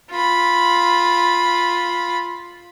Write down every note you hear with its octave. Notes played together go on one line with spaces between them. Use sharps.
F4 B5